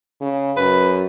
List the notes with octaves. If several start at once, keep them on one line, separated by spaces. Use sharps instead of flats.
C#3
F#2 B4